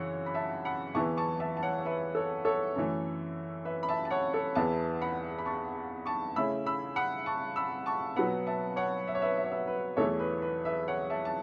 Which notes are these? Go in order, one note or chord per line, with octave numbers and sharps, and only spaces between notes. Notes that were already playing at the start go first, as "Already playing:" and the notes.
Already playing: F#2 C#3 E3 C#5 F#5
B5
E5 A5
F#5 B5
E2 E3 B3 E4 A5 C#6
A5 C#6
E5 A5
A5
C#5 F#5
C#5
B4 E5
A4 C#5
A4 C#5
F#2 E3 A3
B4 E5
B5
E5 A5
A5
C#5 F#5
A4 C#5
E2 E3 B3 E4 E5 A5
F#5 B5
B5
A5 C#6
A5 C#6
C#3 A3 C#4 E4 B5 E6
B5 E6
F#5 B5
A5 C#6
B5 E6
A5 C#6
B2 F#3 B3 F#5 B5
E5 A5
C#5 F#5
E5
C#5
B4 E5
E5
C#5
B4 E5
B4
E2 E3 A3 E4 A4 C#5
B4
B4
B4 E5
C#5 F#5
E5 A5
A5